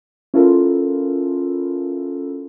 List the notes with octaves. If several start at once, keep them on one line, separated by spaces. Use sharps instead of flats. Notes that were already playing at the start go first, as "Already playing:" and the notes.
C#4 E4 F4 A4 A#4